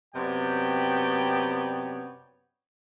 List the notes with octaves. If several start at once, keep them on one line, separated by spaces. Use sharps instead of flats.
F#2 C3 B3 C#5 D5 G5